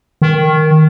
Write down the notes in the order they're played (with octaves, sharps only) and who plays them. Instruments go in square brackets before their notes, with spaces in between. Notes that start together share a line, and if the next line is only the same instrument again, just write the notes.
[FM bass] D#3